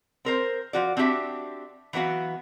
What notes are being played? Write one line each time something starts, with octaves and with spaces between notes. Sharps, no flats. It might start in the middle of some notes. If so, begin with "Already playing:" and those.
C4 A#4 C5
F3 F#4 D5
C4 D4 F#4 G4 E5
E3 F#3 B3 F#4 F5